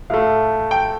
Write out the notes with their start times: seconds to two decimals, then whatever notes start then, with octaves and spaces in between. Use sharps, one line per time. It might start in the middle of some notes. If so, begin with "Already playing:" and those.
0.10 A2 A3 F5
0.71 G5